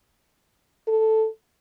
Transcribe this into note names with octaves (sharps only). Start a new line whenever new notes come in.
A4